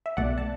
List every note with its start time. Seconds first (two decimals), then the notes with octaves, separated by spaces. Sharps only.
0.06 E5
0.17 B1 B2 A3 D5 F#5
0.38 A5